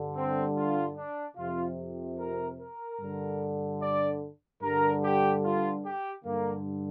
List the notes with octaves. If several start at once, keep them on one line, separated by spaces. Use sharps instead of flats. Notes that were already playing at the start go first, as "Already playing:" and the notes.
Already playing: G2 D3
C4
F4
D4
F2 C3 F4
A#4
A#4
G2 D3
D5
G2 D3 A#4
G4
F4
G4
G2 D3 A#3